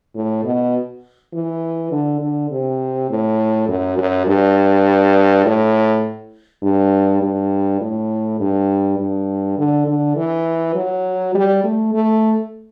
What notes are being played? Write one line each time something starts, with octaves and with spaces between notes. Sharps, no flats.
A2
B2
E3
D3
D3
C3
A2
F#2
F#2
G2
A2
G2
G2
A2
G2
G2
D3
D3
E3
F#3
G3
A3
A3